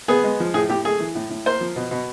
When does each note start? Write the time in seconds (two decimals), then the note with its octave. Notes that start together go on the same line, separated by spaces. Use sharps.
0.08 B3 G#4
0.24 G#3
0.40 F3
0.54 A2 G#4
0.69 A2 G4
0.85 A3 G#4
1.00 E3
1.15 A2
1.30 A2
1.46 A#3 C5
1.60 F3
1.76 B2
1.91 B2